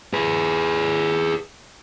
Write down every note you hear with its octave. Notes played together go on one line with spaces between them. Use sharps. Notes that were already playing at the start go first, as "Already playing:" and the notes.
G#4 B4